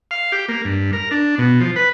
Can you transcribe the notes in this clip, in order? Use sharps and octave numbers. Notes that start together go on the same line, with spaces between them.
F5
G4
A#3
G2
A#4
D4
B2
F3
B4